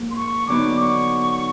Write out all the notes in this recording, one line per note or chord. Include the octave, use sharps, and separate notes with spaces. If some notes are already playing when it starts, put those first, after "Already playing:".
Already playing: G#2 F3 A#3
C6
C#6
D3 F#3 B3 D#4 D6
C#6